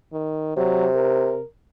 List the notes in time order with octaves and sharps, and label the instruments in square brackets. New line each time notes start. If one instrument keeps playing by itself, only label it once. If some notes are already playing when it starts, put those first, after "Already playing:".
[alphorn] D#3
[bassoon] C3 [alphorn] F#3
[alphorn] A#4